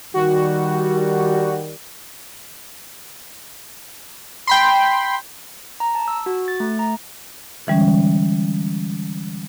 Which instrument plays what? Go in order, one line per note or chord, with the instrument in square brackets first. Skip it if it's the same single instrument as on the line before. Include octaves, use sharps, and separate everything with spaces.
[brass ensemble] D#3 G3 [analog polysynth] F#4
[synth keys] G5 B5 C6
[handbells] A#5
A5
E6
F#4
A6
A3
A#5
[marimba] D3 E3 G3 G#3 C#4